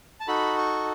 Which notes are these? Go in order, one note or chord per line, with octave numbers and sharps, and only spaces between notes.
A5
D#4 F#4 A4 B5
C#6